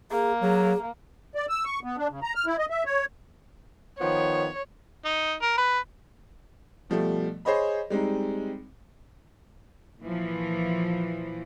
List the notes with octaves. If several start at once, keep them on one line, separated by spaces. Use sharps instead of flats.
A#3 G#4
F#3 G#4
D5
E6
C#6
B3
D4
C#3
A#5
F6
E4
D#5
E5
C#5
D#3 F3 B3 C#5
D#4
A#4
B4
B2 F3 G3 A3
G#4 C5 C#5 D#5 B5
G3 G#3 C4 D#4
A#2 E3 F3